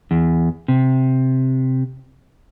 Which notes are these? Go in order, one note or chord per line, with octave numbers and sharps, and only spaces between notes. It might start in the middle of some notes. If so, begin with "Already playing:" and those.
E2
C3